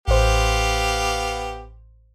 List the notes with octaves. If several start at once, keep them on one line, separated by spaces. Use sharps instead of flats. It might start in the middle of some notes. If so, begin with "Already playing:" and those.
A1 B3 G4 C5 F5